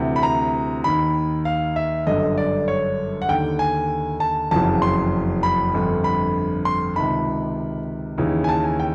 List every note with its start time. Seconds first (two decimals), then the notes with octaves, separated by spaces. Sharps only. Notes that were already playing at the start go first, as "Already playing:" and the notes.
Already playing: D2 C3 E3
0.16 B5
0.23 A#5
0.84 D#2 D#3 B5
1.45 F5
1.76 E5
2.07 G1 F#2 D3 D#5
2.38 D5
2.68 C#5
3.22 F#5
3.29 D#2 D3 G5
3.59 G#5
4.20 A5
4.51 F#1 F2 C#3 E3 A5
4.82 C6
5.43 B5
5.74 G1 F2 D3
6.04 B5
6.65 C6
6.96 C#2 C3 D#3 B5
8.18 D#2 C#3 E3
8.44 G#5
8.49 A5
8.64 G#5
8.80 G5